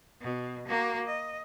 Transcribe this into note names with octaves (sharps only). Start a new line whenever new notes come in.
B2
A#3 F#4
D#5